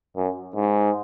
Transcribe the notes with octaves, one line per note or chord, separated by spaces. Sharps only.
F#2
G#2